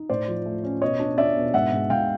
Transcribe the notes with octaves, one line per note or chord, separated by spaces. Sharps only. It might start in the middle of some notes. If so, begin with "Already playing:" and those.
Already playing: D#4
A2 C5 D5
F3
A3
C#4
B2 C#5 D#5
D4
D4 D5 E5
B2
G#2 E5 F#5
G#2
G#2 F5 G5